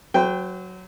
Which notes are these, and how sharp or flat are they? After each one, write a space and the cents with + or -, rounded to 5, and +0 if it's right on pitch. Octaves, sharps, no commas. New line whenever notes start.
F#3 +0 C5 -40 G5 +5